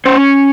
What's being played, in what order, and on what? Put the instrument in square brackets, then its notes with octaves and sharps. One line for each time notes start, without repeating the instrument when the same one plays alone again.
[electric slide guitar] C#4 C5